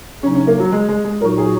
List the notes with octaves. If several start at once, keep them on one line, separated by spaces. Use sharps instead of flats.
C#3 F#3 C#4 D#4
C#4
A#3
F#3
G#3
G#3
G#3
A#2 F#3 D#4 F#4 A#4
G#4